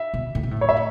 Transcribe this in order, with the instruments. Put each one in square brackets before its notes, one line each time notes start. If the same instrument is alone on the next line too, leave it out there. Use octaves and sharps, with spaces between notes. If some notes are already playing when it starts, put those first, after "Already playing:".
Already playing: [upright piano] E5
[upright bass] B2
A2
B2
A2
[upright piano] C#5
E5